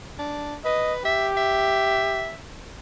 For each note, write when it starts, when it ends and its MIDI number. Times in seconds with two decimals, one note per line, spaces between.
0.19 0.55 62
0.65 1.00 71
0.65 0.94 75
1.05 2.31 67
1.05 1.29 76
1.37 2.36 76